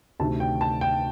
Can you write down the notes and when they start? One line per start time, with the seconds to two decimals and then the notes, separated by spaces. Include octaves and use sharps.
0.20 D2 C3 D#3 A5
0.40 G5
0.61 A5
0.81 G5